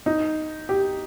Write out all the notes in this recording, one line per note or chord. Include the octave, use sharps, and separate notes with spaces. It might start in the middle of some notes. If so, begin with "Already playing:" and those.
D#4
G4